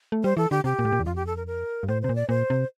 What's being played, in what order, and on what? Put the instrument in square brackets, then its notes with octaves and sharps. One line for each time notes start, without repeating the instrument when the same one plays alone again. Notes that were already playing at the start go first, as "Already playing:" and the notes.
[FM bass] A3
[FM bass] G3 [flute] C5
[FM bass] E3 [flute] A4
[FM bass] D3 [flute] G4
[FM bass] C3 [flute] G4
[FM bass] A#2
A2
A#2
E2
[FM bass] F2 [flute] F4
[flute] G4
A4
A#4
A#4
[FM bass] G2
[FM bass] A2 [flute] C5
[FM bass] C3 [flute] C5
[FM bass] A#2
[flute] D5
[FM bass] A#2 [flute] C5
[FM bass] C3